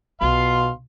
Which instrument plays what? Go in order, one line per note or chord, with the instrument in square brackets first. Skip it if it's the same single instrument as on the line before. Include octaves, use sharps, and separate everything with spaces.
[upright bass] B1 [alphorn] B2 [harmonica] F5 C6